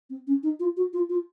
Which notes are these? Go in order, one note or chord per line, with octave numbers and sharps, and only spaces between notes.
C4
C#4
D#4
F4
F#4
F4
F4